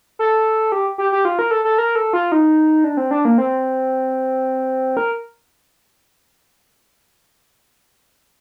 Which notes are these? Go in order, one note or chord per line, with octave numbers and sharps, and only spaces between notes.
A4
G4
G4
G4
F4
A#4
A4
A4
A#4
A4
F4
D#4
D4
C4
D4
A#3
C4
A#4